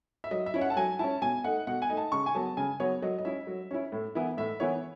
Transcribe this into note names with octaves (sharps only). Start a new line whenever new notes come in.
E5
F#3 D#5
E5
C#4 E4
F#5
A5
F#3 G#5
C#4 E4 A5
B2 G#5
A3 D#4 F#5
B2 F#5
G#5
A3 D#4
A5
C#3 C#6
G#5
F#3 B3 A5
C#3 G#5
F#3 B3 C#5
F#3 D#5
D#5
C#4 E4 E5
F#3
C#4 E4
A2
E3 B3 E4
A2 E5
E3 B3 E4 C#5